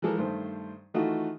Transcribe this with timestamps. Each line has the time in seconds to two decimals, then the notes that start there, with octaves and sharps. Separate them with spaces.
0.02 E3 F3 G#3 A4 A#4
0.18 G2 D#3 A3 C5
0.94 D#3 E3 A3 D#4 F4 F#4